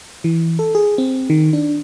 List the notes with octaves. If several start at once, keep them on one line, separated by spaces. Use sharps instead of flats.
E3
A4
G#4
C4
D#3
D4